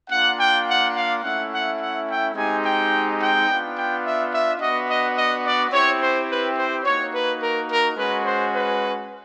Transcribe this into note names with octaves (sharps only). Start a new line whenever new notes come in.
A#3 D4 F4 F#5
G5
F#5
F5
A3 C#4 E4 F#5
F#5
F#5
G5
G#3 C4 D#4 G4 G#5
G5
G5
B3 D4 F4
G5
E5
E5
B3 D4 F#4 D#5
D#5
D#5
D5
C4 E4 G4 C#5
C5
B4
C5
A#3 D#4 F#4 C#5
B4
A#4
A#4
G#3 C#4 F#4 B4
C5
B4